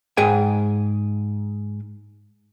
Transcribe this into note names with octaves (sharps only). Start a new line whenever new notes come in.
G#2 G#4 G5 G#5